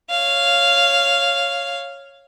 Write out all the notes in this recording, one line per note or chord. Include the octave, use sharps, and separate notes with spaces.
C#5 F5